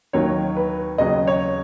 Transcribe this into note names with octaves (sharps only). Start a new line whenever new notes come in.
D#2 D#3 F#3 C#5
B4
D#2 C#3 F#3 D#5
C#5